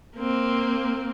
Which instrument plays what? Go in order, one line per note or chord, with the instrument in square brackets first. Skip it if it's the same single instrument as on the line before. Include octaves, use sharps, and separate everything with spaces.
[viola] A#3 C4